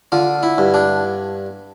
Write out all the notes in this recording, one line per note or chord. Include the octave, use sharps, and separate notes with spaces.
D3 F4
E4
G2
D4